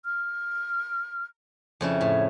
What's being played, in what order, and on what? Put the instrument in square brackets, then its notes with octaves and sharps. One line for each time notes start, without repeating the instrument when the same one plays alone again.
[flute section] F6
[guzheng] F2 C#3 E4
[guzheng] A2 [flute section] C#5 E5